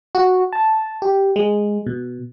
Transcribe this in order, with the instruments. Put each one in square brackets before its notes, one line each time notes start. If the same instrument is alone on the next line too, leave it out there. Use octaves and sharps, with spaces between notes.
[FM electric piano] F#4
A5
G4
G#3
B2